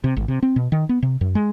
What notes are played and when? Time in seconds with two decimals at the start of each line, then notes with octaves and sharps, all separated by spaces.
0.04 C3
0.17 G#1
0.28 C3
0.43 C4
0.56 B2
0.72 D#3
0.89 B3
1.03 C3
1.21 F#2
1.35 G#3